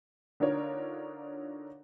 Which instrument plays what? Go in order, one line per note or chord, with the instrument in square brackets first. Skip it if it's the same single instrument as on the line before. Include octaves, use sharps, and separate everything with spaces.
[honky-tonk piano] D3 D4 D#4 F4 A#4 C#5